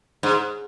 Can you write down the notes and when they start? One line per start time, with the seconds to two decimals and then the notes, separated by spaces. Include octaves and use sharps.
0.23 G#2